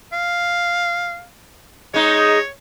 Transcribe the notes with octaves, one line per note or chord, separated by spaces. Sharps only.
F5
G#3 D#4 C#5